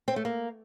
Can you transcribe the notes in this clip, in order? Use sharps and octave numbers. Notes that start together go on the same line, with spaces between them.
C4
A3
A#3